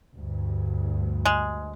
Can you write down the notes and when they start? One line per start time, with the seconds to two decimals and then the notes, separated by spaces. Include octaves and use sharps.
0.17 D2 G2
1.25 G#3